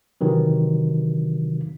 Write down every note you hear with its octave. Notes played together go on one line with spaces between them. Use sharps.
C3 D#3 E3 F#3